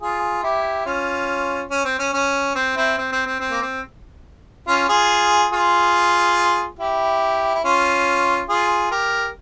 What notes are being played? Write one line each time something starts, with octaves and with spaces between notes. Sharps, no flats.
F4 G#4
E4 G4
C#4 F4
C#4
C4
C#4
C#4
C4
C4 E4
C4
C4
C4
C4
A#3
C4
C#4 F4
F4 G#4
F4 G#4
E4 G4
E4
C#4 F4
F4 G#4
G4 A#4